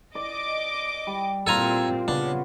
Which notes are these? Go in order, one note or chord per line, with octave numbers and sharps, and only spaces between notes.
D5 D#5 D6
G3
A#2 C4 F4 G4 A4 D5 G#5 A#5
C#3 B3 D4